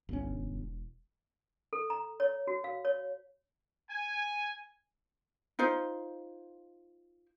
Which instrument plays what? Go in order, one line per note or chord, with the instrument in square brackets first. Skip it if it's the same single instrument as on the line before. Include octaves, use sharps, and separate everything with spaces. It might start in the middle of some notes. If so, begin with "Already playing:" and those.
[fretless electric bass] G1 C#4 [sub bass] C2
[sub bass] E1
[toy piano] A4
A#5
C#5
F#4
F5
C#5
[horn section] G#5
[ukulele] D#4 F4 C5